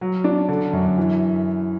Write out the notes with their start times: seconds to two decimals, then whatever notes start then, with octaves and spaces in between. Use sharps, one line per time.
0.01 F#3
0.24 D4
0.49 D3
0.73 F#2
0.98 E3